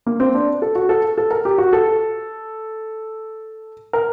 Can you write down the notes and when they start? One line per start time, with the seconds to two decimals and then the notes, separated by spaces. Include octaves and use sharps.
0.06 A#3
0.20 C4
0.34 D4
0.62 A4
0.75 F#4
0.89 A4
1.18 A4
1.31 A#4
1.45 G4
1.58 F#4
1.73 A4
3.93 A#4